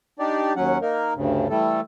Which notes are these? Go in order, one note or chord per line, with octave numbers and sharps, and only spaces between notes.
D4 D#4 G4 D5
D#2 F#3 C#4 F#5
A#3 D#4 A#4
D2 G2 C#3
E3 G3 A3 A4